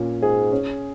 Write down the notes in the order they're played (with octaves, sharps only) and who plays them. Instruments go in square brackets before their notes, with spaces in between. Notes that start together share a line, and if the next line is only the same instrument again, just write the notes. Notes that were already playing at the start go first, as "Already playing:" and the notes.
Already playing: [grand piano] A#2 C#4
[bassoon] G#2 [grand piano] G#4
[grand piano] C#4